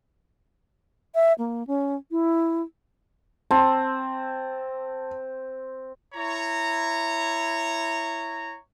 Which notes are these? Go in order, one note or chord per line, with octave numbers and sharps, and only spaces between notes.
E5
A#3
C#4
E4
C4 A5
E4 C#5 A#5